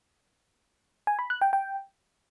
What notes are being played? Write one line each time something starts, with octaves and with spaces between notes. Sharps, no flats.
G#5
B5
F#6
G5
G5